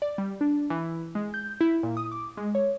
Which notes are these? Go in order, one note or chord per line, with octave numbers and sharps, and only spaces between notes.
D5
G3
D4
E3
G#3
G6
E4
A#2
D#6
D6
G#3
C#5